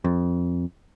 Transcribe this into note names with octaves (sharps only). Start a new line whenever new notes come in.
F2